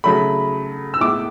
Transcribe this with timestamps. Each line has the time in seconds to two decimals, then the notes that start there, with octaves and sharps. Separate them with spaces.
0.04 C#3 F#3 A3 B5
0.94 E6
1.00 A2 G#3 B3 D6